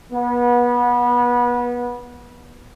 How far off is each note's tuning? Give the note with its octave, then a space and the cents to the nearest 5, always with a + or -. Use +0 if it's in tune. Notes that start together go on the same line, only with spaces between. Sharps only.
B3 -25